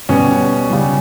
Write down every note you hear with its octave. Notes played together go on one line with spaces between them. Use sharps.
B2 G3 C#4
C#3 G3